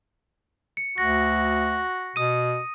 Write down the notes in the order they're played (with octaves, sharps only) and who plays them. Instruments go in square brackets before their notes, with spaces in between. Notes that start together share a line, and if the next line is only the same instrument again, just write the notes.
[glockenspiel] C#7
[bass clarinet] D2 [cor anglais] F#4 [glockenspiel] A#6
[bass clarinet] B2 [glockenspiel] D#6 D#7